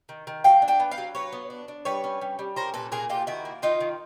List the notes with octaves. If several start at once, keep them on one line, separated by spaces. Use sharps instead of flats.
D#3
D#3
F#3 F5 G5
D4
G5 A5
B3
F5 G5
F#3
F#3 B4 C#5
B3
D4
D4
G3 B4 C#5
C#4
G3
G3
C#4 A#4 C5
A#2 A4 B4
A#2 G#4 A#4
A#2 F4 G4
D#3 E4 F#4
A#3
D#3 D#4 F4
D#3